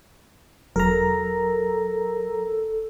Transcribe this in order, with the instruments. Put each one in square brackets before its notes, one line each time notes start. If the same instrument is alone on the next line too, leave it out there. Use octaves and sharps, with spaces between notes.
[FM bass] E1 [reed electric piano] F#3 [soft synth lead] A4 [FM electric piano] A#4 A#5